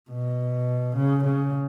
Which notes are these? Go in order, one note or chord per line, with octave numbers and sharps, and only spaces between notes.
B2
C#3
C#3